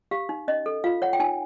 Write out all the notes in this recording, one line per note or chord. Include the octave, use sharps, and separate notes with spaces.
G4 F5
D#4
C#4 D#5
A4
F4 F5
C#5 F#5
G5
D#4 G#5